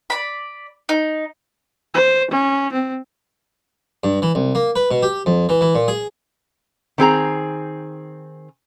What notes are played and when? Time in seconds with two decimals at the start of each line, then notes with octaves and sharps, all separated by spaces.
0.10 D5 B5
0.89 D#4
1.94 C5
2.31 C#4
2.73 C4
4.04 G2
4.22 E3
4.35 C2
4.55 A#3
4.76 B4
4.91 B2
5.03 G4
5.26 F2
5.49 E3
5.61 E3
5.75 A#2
5.88 G#4
6.98 D#3 C4 G#4 A#5